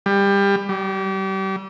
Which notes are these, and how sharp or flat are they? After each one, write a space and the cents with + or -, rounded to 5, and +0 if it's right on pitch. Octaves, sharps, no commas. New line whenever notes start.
G3 +25
G3 -30